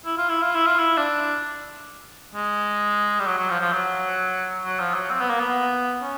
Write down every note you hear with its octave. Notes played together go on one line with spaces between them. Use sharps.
E4
F4
E4
F4
E4
F4
E4
D4
G#3
G3
F#3
F#3
F3
F3
F#3
F#3
F3
F#3
C4
B3
A#3
B3
C#4